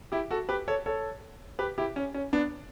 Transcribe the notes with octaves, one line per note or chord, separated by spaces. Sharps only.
E4 G4
F#4 A4
G4 B4
A4 C#5
A4 C#5
G4 B4
E4 G4
C#4
C#4
B3 D4